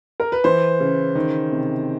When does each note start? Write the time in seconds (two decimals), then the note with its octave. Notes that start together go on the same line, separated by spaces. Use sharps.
0.20 A#4
0.32 B4
0.44 E3 C5
0.80 C#3
1.15 D#3
1.52 C3